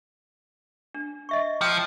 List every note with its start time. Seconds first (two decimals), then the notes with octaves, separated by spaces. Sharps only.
0.94 D4
1.29 D#5 E5 C#6
1.62 F3 G5 A#5 E6